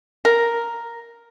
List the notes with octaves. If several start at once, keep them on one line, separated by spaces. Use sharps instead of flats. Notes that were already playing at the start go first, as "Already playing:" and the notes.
A#4